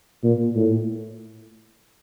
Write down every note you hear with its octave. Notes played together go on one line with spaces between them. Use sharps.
A#2
A2